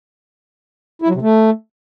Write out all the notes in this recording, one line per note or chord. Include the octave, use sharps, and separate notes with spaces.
E4
F#3
C3
A3